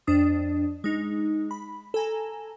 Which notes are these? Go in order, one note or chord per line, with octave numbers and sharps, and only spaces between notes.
F2 D4 D#6
G#3 D#4
B5
A4 G#5 A#5